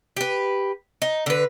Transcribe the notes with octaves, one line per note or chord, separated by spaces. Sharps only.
G4 B4
D#4
D3 B4